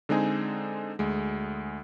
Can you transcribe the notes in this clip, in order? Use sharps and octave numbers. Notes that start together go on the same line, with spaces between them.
D3 G#3 C4 D#4 G#4
D2 G#3